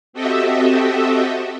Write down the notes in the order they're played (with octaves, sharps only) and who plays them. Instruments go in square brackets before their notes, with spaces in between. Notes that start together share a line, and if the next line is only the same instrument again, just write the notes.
[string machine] C4 F#4 G4 A4 D#5 E5